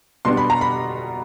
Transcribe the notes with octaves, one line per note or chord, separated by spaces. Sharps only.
B2 G3 B3 D4 C6
B5
A#5
B5